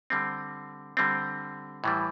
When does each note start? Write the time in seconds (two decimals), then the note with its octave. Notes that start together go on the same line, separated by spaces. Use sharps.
0.10 D3 G3 C4
0.97 D3 G3 C4
1.84 A2 E3 G3